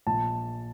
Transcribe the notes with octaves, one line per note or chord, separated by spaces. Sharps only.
A#1 A5